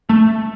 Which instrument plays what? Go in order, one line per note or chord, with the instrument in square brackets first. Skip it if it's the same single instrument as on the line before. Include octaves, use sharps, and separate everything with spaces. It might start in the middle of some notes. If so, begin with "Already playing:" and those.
[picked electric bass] A3